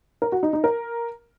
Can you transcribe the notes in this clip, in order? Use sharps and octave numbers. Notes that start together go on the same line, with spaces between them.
A#4
F#4
D#4
D#4
A#4